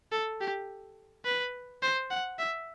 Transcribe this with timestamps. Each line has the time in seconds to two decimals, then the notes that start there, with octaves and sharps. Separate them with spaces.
0.12 A4
0.41 G4
1.25 B4
1.82 C5
2.10 F#5
2.39 E5